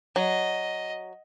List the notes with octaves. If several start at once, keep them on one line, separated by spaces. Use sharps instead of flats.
F#3 D#5